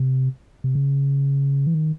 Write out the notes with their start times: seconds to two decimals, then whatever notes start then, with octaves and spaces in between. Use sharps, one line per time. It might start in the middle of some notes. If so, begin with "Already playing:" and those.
Already playing: C3
0.64 C3
0.75 C#3
1.67 E3
1.74 D#3